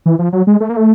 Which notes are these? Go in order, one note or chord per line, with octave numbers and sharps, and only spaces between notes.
E3
F3
F#3
G#3
A3
A#3
A3